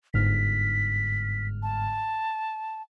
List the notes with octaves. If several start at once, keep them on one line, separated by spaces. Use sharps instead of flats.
G1 G#2 F6 B6
A5